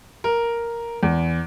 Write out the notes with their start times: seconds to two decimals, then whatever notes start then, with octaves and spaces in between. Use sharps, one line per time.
0.24 A#4
1.03 E2